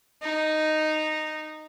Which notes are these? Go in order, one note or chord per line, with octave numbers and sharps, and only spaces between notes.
D#4